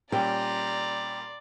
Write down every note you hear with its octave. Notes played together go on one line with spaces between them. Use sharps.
A#2 G3 C#4 D5 G5 A#5 C6